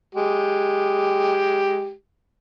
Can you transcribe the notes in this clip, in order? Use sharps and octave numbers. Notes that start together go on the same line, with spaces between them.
G#3 G4